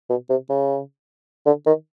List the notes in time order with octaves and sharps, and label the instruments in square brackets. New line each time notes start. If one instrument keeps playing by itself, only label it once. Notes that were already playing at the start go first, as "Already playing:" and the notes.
[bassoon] B2
C3
C#3
D3
D#3